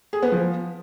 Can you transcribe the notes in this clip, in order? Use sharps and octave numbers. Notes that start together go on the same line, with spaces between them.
G#4
B3
F3